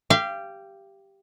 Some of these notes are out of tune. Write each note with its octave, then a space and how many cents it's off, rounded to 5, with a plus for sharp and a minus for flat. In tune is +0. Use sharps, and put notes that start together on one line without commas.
G4 +0 F5 -30